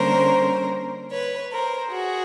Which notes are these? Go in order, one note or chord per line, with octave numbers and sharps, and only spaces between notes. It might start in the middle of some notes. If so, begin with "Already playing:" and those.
Already playing: D3 G3 A#3 C#4 A#4 C5
B4 C#5
A#4 C5
F#4 G#4